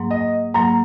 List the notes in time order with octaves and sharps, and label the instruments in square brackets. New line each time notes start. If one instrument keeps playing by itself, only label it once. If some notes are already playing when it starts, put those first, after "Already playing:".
Already playing: [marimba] G#2 F#3 A#3
[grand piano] D#5
[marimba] G#2 F#3 A#3 [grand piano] A#5